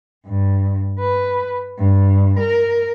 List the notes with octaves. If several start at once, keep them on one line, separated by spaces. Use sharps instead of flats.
G2
B4
G2
A#4